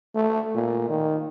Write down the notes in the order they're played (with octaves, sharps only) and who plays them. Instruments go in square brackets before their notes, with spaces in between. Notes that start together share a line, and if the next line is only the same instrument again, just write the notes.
[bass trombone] A3
A#2
D#3